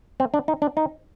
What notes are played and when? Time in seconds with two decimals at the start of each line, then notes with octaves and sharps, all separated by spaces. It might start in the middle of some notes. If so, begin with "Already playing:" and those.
0.20 C4
0.34 D4
0.48 D#4
0.62 D4
0.77 D#4